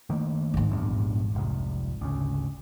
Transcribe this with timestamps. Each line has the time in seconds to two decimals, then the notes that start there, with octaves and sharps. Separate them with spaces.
0.10 D#3 A3 A#3
0.54 G#1 G#2
0.71 A#1 E2 G2
1.35 F1 C2
2.01 D2 C#3